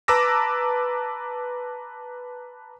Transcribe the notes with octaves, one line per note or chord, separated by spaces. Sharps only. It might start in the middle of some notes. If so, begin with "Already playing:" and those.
B4 A5 A#5 D6 E6 A#6